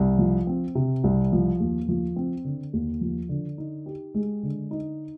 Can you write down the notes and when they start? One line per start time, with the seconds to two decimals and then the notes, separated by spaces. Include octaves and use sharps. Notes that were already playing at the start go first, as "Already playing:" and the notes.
Already playing: C2
0.19 F3
0.47 C4
0.75 C3
1.04 C2
1.32 F3
1.60 D#2
1.89 F3
2.16 C4
2.45 D3
2.73 D#2
3.01 F3
3.29 D3
3.58 D#4
3.86 G4
4.14 G#3
4.43 D3
4.71 D#4